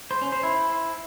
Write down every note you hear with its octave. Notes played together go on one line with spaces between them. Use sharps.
C5
C#4
C5
E4